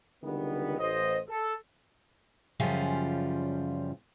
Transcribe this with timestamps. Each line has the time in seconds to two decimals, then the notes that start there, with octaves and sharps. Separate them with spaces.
0.23 C#2 D3 D#3 G3 B3
0.78 A1 C5 D#5
1.28 A4
2.60 F#2 C#3 F3 G3 C#4 F4